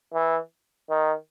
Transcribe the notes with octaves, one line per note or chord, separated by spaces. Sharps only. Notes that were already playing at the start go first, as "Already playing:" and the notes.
E3
D#3